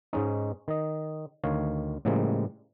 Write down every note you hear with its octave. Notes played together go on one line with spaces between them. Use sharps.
G#2 G#3 C#4 D#4
D#3 D#5
D2 D#3 C#5 F5
A2 C#3 F3 G3 G#3 A#3